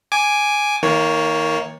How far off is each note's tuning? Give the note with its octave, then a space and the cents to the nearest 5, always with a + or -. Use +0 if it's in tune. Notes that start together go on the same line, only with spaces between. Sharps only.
G#5 +0 D6 +0
D#3 +40 A#3 +0 C#5 +0